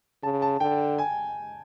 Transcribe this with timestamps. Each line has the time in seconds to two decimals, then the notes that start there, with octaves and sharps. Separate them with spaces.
0.23 C#3 A5
0.42 A5
0.60 D3 G5
0.98 G#5